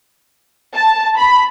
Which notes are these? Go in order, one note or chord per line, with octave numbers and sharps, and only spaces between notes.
A5
B5